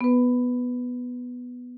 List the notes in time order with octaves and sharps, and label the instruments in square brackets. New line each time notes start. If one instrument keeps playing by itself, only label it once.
[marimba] B3 B4